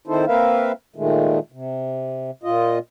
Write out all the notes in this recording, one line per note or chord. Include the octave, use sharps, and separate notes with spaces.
D#3 C4 D#4 E4 A4 C5
A#3 C4 A#4 B4 E5 F5
A#2 D#3 G#3 A3
C3
A#2 F4 D#5